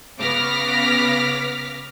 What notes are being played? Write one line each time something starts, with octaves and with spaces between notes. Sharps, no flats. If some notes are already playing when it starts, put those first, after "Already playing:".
C#3 B3 D6 F6 A#6 B6